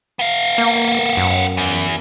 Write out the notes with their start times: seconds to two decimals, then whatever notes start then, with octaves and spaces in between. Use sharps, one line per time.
0.19 B3 F5
0.58 A#3
1.17 F#2
1.57 E2